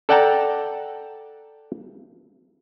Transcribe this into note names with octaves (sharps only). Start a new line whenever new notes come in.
A4 D5 F#5 G5 A5 A#5